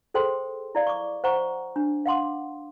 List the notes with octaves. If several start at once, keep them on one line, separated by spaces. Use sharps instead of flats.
G#4 A4 C5 G5 C6
E4 D5 F5
C#6 D6
C5 F#5 A#5 C#6
D4
F5 F#5 C6 D6